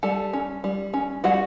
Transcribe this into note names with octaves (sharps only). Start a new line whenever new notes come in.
G3 A4 A5
C#4
G3
C#4
G3 F#4 F#5